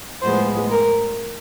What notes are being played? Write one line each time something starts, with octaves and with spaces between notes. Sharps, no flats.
A2 F3 G#3 B3 C5
A#4